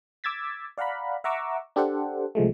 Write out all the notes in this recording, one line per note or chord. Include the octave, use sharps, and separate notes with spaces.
D6 E6 G#6 A6 B6
D5 F5 F#5 A#5 B5
E5 F#5 A#5 C#6 D6 E6
D4 G4 A4 C5 F#5
C2 F3 G#3 A3